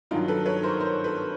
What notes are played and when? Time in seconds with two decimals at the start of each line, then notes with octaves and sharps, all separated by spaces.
0.11 G2 D#3 F#3 D#4 F4
0.28 A4 B4
0.45 B4 C#5
0.63 A#4 C5
0.80 A#4 C5
1.04 A4 B4